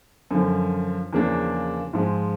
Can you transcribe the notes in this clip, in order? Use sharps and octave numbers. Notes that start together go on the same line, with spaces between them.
F#2 D3 F3
E2 C#3 F3 A#3 D4
G#2 F3 G#3